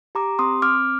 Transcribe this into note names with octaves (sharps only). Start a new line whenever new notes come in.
G4 A#5 D6
C4 C6 D#6
C4 D6 F6